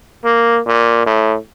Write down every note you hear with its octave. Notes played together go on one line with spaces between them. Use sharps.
A#3
A#2
A2